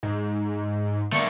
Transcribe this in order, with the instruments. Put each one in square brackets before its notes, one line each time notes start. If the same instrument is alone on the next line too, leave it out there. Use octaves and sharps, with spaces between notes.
[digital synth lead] G#2
[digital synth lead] D3 [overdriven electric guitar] A3 A#3